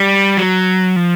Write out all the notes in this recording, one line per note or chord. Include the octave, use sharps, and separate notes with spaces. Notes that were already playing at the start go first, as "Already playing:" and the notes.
Already playing: G3
F#3
F3